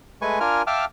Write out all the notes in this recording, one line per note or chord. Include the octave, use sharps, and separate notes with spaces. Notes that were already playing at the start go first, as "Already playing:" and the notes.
G#3 A3 B4 G#5 C#6
D4 F4 A#4 G#5 F6
E5 F5 G5 A5 D6 F6